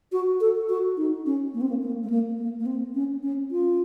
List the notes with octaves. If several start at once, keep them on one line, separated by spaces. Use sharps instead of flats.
F#4
A4
F#4
D#4
C#4
A#3
C4
A#3
A#3
A3
A#3
A#3
A#3
C4
C#4
C#4
F4